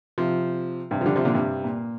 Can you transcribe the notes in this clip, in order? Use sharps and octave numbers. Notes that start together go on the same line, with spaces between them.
C3 F3
G2 C3
F3
D3 G3
C3 F3
A#2 D3
G2 C3
A#2